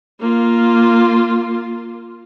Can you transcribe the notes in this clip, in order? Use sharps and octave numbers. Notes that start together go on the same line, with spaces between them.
A#3 F4